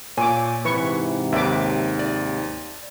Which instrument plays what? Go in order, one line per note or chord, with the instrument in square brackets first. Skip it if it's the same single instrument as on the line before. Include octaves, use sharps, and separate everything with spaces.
[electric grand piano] A#2 [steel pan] C#5 D6 [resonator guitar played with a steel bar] G#5
[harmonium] G#2 C3 [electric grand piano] E3 [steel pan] B4 C#6
[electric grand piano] D#2 [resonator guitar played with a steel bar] B4 D5 [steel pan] E5 D6
[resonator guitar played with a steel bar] D5